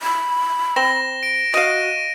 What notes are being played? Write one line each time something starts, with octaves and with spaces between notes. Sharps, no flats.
B5
C4 A#6 E7 G7
D7
F#4 D#5 F5 A#6 D#7 E7